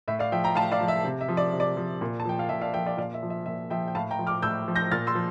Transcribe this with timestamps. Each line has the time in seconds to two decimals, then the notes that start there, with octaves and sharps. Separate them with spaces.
0.08 A2 E5
0.19 D5 F5
0.32 F3 E5 G5
0.44 G5 A#5
0.55 A2 F5 A5
0.72 D5 F5
0.81 F3
0.88 E5
1.04 C3
1.21 E5
1.29 F3
1.37 D5
1.53 C3
1.60 D5
1.77 F3
2.01 A#2
2.20 A5
2.25 F3 G5
2.39 F5
2.49 A#2 E5
2.61 D5 F5
2.73 F3 E5 G5
2.86 D5 F5
2.97 A#2 D5 F5
3.14 E5
3.23 F3
3.30 E5
3.46 A#2 E5
3.70 F3 E5 G5
3.88 G5
3.95 A2 F5 A5
4.11 G5 A#5
4.19 F3
4.27 D6 F6
4.42 A2 E6 G6
4.68 F3
4.76 G6 A#6
4.91 A#2 F6 A6
5.07 C6 E6
5.15 F3